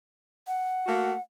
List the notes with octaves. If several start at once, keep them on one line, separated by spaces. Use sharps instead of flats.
F#5
A3 A#3 F#4